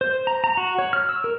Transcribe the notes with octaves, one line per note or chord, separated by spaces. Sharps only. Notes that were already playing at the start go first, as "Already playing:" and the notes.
C5
A#5
A#5
F#4
C#5
F6
E6
A#4